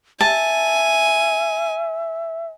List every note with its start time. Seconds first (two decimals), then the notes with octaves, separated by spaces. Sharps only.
0.21 E5 G#5 A5